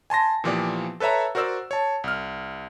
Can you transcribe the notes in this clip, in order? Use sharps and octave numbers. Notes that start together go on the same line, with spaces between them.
G#5 A5 C6 A#6
A#2 E3 F3 B3 G4 D5
A4 B4 C#5 E5 A#5
F#4 A#4 C5 D5 E6
C#5 A5
C2 F6